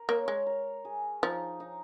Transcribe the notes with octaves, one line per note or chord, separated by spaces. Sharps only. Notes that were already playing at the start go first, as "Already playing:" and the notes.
Already playing: A#4
A#3 C#5
G#3 C#5
A#4
G#4
F3 D#4
D#4